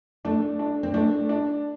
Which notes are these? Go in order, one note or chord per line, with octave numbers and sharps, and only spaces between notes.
A3 D4
D4
C4
A3 D4
D4